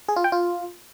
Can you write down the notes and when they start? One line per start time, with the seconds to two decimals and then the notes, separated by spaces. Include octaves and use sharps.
0.08 G#4
0.16 F4
0.24 G5
0.32 F4